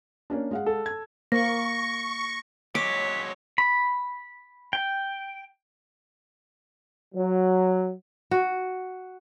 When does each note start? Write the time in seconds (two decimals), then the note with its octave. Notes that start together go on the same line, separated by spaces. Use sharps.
0.30 A#3 C#4 D4
0.51 G#3 F5 F#5
0.66 A4
0.86 G#6
1.32 A#3 C#6 A#6
2.75 F#3 G#3 C#5 D6 B6
3.58 B5
4.73 G5
7.15 F#3
8.31 F#4